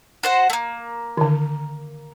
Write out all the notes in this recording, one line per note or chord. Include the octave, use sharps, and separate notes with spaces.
F#4 C5 F#5
A3 A#3
D3 D#3